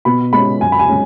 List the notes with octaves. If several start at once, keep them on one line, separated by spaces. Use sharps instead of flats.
B2 B5
G#3 C#4 B5
F#2 G#5
B5
G#5
G#3 C#4